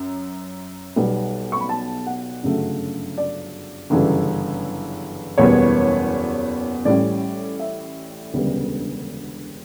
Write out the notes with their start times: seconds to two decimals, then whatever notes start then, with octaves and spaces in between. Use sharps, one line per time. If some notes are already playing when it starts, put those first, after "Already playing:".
Already playing: F#2
0.96 B1 B2 G3 B3
1.52 C#6
1.61 B5
1.69 A5
2.06 F#5
2.43 G1 F#2 C#3 F#3 A3
3.18 D5
3.90 G1 F#2 C#3 E3 G3
5.38 F#1 E2 B2 G3 B3 C#5
6.85 A1 A2 G3 C#4 D5
7.60 E5
8.33 E1 D2 C#3 G3 B3